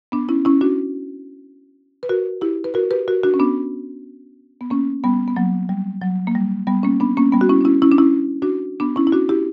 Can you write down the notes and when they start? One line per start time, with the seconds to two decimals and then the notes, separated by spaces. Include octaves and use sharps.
0.12 B3 D4
0.29 C#4 E4
0.45 C#4 E4
0.61 D4 F#4
2.03 B4
2.09 F#4 A#4
2.41 E4 G4
2.64 B4
2.74 F#4 A#4
2.91 G4 B4
3.08 F#4 A#4
3.23 D4 F#4
3.34 C#4
3.39 B3 D4
4.61 B3
4.70 A#3 C#4
5.04 G3 B3
5.28 B3
5.37 F#3 A#3
5.69 G3
6.01 F#3
6.27 A#3
6.35 G3
6.67 G3 B3
6.83 A#3 C#4
7.00 B3 D4
7.17 A#3 C#4
7.32 G3 B3
7.41 F#4
7.49 C#4 E4
7.61 D4
7.65 C#4 E4
7.82 C#4 E4
7.92 D4
7.98 C#4 E4
8.42 D4 F#4
8.80 B3 D4
8.96 C#4 E4
9.07 E4
9.12 D4 F#4
9.29 E4 G4